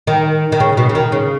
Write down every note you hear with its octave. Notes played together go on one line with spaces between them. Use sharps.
D#3
D#3
C#3
B2
C#3
D#3
C#3